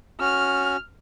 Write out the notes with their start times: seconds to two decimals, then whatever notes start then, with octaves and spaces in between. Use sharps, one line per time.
0.20 C#4 F#4 F6